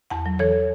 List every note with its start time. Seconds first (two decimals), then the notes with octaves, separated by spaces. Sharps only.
0.10 E2 F#5 A5
0.26 F#3
0.39 E3 A4 C#5